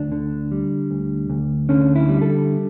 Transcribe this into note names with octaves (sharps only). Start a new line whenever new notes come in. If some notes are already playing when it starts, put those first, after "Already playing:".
Already playing: D2 D4
D3
G3
D2
D2
D3 C#4
E4
G3
A4